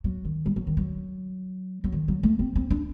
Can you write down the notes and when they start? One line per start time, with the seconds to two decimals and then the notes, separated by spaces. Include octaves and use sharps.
0.04 F#3
0.25 D#3
0.46 G3
0.56 F#3
0.67 D#3
0.77 F#3
1.84 F#3
1.92 D#3
2.08 F#3
2.23 A3
2.39 C4
2.56 C4
2.70 D4